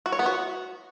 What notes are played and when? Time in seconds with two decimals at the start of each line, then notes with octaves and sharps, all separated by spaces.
0.06 F#4
0.12 C#5
0.19 B3
0.26 F#4